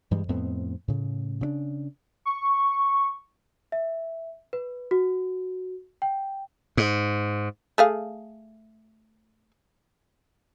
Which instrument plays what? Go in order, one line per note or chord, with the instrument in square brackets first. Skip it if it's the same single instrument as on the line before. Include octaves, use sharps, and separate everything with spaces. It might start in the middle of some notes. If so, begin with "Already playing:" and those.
[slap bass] G2 E3 G3 G#3
F2 A2 B3 C4
A2 C#3
C#3 C4 D4
[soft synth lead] C#6
[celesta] E5
B4
F#4
G5
[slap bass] G#2
[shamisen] A3 G#4 F5